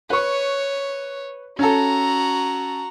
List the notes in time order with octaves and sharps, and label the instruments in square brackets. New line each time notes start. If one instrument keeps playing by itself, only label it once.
[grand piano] B4 C#6 [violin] C#5
[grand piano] C#4 A4 [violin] F#4 A#5